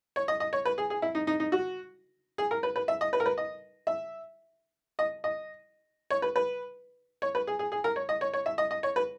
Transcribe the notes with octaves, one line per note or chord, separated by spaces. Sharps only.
C#5
D#5
D#5
C#5
B4
G#4
G#4
E4
D#4
D#4
D#4
F#4
G#4
A#4
B4
B4
E5
D#5
B4
A#4
B4
D#5
E5
D#5
D#5
C#5
B4
B4
C#5
B4
G#4
G#4
G#4
A#4
C#5
D#5
C#5
C#5
E5
D#5
D#5
C#5
B4